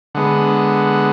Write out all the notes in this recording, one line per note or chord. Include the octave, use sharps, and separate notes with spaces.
D3 G#3 B3 F#5